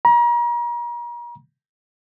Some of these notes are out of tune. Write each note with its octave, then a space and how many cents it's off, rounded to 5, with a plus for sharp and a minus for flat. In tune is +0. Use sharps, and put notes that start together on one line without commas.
A#5 +40